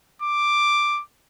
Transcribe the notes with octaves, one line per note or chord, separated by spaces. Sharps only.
D6